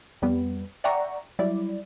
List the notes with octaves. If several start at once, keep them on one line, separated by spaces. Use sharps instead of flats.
F2 G3 B3
D5 E5 F#5 G5 A#5 C#6
F#3 G3 E4 D5